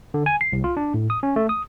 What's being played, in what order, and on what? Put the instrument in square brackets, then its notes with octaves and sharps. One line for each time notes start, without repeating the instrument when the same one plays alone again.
[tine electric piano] D3
G#5
C7
C2
F4
D4
A2
D#6
C#4
A3
D#6